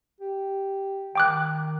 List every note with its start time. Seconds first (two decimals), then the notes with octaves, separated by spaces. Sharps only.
0.21 G4
1.15 D#3 G5 D6 F#6